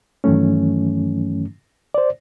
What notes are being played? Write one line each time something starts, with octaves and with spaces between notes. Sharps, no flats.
G2 D#3 E3 F#3 A3 C#4
C5 D5